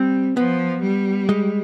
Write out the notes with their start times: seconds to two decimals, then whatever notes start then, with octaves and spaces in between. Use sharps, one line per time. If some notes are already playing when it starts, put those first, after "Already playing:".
Already playing: G3 C4
0.37 F3 B3
0.83 G3
1.29 G#3